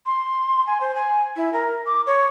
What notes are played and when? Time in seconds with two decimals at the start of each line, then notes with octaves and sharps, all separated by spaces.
0.06 C6
0.67 G#5
0.81 C5
0.95 G#5
1.36 E4
1.53 A#4
1.86 D6
2.07 C#5